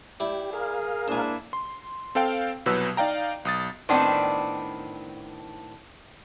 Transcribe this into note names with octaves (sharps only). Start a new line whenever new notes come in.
E4 G4 D5
G#4 A#4 F5
A#3 D4 E4 C5 G#5
C6
C4 A4 F5 G5
C2 B2 F#3 B4 E6
D#4 D5 F5 G5 A#5
B1 D#6 A6
A2 D#3 B3 C4 D4